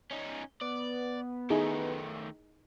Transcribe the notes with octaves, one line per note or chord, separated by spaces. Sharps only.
C#4 D#4
B3 D5
D#3 A3 D#4 E4 G#4